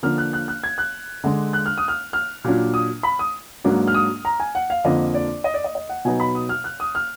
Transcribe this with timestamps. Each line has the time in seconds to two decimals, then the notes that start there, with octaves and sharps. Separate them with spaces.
0.03 D3 F3 A#3 D4 F6
0.18 F#6
0.33 F#6
0.48 F#6
0.64 G#6
0.78 F#6
1.24 D3 G#3 D4
1.53 F#6
1.66 F6
1.78 D#6
1.88 F6
2.13 F6
2.44 A#2 F#3 D4
2.74 D#6
3.03 B5
3.19 D#6
3.64 G#2 F#3 A#3 D4
3.87 F6
3.94 D#6
4.25 A#5
4.40 G#5
4.55 F#5
4.70 F5
4.84 F2 D3 F3 A#3 D4 D#5
5.14 D5
5.44 D#5
5.54 D5
5.64 D#5
5.75 D#5
5.89 F#5
6.05 B2 F#3 B3 D#4 G#5
6.20 B5
6.35 D#6
6.49 F6
6.64 F#6
6.80 D#6
6.95 F6